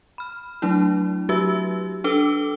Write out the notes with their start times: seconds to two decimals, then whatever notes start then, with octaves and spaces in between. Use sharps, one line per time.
0.18 B5 F6
0.62 F#3 A3 D4 E4
1.29 F#3 F#4 G4 B4 E5 E6
2.04 D4 A4 B4 D6 E6 G7